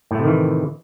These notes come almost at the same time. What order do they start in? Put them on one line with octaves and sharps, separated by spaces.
A2 A3 C3 D#3 E3